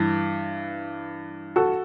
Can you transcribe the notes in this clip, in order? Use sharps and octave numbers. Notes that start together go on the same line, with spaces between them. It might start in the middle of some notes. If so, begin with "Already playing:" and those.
Already playing: G2 E3
F#4 A4